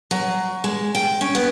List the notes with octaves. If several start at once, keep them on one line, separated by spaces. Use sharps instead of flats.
F#3
G#3
G5
C#4
B3